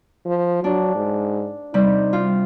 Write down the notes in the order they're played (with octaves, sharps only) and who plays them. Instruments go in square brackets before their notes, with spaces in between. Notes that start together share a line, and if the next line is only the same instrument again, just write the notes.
[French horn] F3
[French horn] F#3 [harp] D4
[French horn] G#2
[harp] C3 G3 [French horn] D#4
[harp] F4